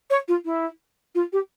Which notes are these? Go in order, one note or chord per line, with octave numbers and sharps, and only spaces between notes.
C#5
F4
E4
F4
G4